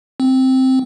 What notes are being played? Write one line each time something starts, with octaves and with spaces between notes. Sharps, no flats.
C4